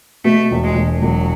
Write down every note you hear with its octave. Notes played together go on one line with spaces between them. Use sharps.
B2 A3
E1
G#3
E1
E1 F#3